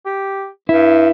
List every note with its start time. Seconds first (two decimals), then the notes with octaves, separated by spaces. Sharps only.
0.05 G4
0.69 G2 E4